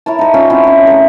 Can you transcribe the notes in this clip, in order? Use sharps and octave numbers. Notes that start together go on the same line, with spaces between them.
E4 A#4 C#5 A5
D#4 A#4
C#4 F4 A4 C5
C4 E4 F#4
C#4 C#5
A3 A#4